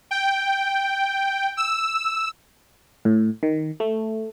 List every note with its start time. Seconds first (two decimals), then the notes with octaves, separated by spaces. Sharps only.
0.11 G5
1.57 E6
3.05 A2
3.43 D#3
3.80 A3